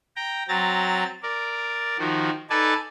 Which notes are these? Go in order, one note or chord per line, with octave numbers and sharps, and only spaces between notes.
G5 A#5
F#3 C4 A#5 A6
A#4 D5
D#3 F3 F#4
D#4 A4 B4 D5 G#5 A5